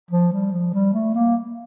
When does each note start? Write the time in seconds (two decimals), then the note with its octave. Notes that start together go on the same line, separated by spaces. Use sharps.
0.11 F3
0.32 G3
0.52 F3
0.73 G3
0.93 A3
1.14 A#3